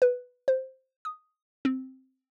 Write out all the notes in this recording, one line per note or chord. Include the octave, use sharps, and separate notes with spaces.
B4
C5
D#6
C4